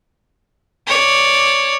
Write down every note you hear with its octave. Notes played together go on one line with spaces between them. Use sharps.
C#5 D5